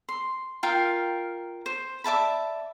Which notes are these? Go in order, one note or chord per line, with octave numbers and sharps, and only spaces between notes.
C6
F4 A#4 F5 G5
C5
D5 E5 A5 B5